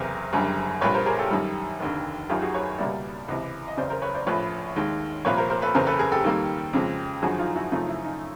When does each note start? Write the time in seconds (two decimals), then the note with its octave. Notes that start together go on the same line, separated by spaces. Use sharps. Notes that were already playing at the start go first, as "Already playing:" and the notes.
Already playing: F#1 E2 C3 A#4 C5
0.33 F#1 F#2 D3 G3
0.81 A#1 A#2 G3 B4 C#5
0.94 A#4 C5
1.06 G#4 A#4
1.19 G4 A4
1.30 F#2 D#3 G3
1.80 F1 D#2 D3
2.29 G#1 F#2 D#3 F4 G4
2.42 F#4 G#4
2.54 B4 C#5
2.79 C#2 B2 G3 A#3 D5 E5
3.28 C#2 C3 E3
3.68 D#5
3.77 F#1 E2 C#3 C5 D5
3.90 A#4 C5
4.02 B4 C#5
4.14 C5 D5
4.27 A#1 A2 F3 B4 C#5
4.76 D#2 D#3 G#3
5.25 C2 A#2 F3 A#3 B4 C#5
5.37 A#4 C5
5.50 A#4 C5
5.62 A4 B4
5.75 F#1 E2 C#3 A#4 C5
5.87 A4 B4
5.99 G#4 A#4
6.12 G4 A4
6.24 D#2 D#3 G3 A#3
6.73 F2 C#3 F3 G#3
7.22 G#1 F#2 D3 F3 F#4 G#4
7.39 D#4 F4
7.55 E4 F#4
7.72 F#2 C#3 F3 A3 D#4 F4
7.88 E4
8.05 D#4